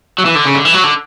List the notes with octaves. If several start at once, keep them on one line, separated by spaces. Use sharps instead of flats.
F#3
E3
D3
C#3
D3
E3
F#3
D3